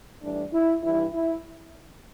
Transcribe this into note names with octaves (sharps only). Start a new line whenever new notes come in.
A2 E3 G3 D4
E4
G2 E3 G3 E4
E4